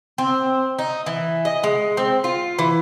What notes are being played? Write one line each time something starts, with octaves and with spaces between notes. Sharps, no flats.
C4
D#4
E3
D#5
G#3
C4
F4
E3